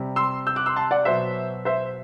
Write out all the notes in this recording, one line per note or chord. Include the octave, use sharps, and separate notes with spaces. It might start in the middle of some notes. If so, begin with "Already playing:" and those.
Already playing: C3 G3
C6 E6
E6 G6
D6 F#6
C6 E6
A5 C6
D5 F#5
B2 F#3 C5 E5
C5 E5